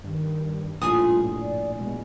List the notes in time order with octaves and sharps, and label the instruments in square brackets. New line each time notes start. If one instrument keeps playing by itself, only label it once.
[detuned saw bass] G2 [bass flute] D#3
[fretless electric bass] A#1 A2 [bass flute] F4 [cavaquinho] G#4 G#5 D#6
[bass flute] D5
[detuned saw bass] B2 [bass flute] G#3